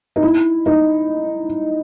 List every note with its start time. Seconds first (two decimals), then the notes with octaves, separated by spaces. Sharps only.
0.16 D#4
0.22 E4
0.66 D#4